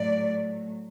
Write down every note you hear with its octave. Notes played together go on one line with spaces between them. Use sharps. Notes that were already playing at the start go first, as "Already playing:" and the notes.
Already playing: A2 F#3 A3 D5